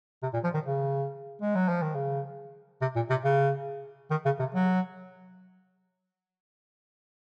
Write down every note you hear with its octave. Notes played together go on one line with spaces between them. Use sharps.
C3
A#2
F3
D#3
C#3
G#3
F#3
F3
D#3
C#3
C3
A#2
C3
C#3
D#3
C#3
C3
F#3